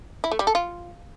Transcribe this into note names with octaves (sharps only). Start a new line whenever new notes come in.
E4
A3
G3
A4
F4